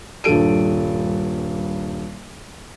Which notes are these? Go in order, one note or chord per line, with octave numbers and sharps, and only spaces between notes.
D#1 G2 A4 D7 D#7